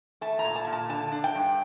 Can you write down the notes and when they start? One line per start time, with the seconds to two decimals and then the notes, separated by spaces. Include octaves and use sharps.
0.21 A3 A5
0.39 A#5
0.44 A#2
0.56 A5
0.67 A#2
0.73 A5
0.89 D3 A5
1.12 D4
1.24 G5
1.35 G2